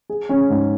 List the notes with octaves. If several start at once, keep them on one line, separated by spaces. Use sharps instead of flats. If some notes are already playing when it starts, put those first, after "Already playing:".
G#4
C#4
G#2